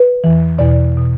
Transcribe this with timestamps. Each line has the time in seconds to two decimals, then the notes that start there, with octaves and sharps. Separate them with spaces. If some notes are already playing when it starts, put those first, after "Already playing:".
Already playing: B4
0.24 E2 E3
0.58 E2 B2 D5
0.98 B2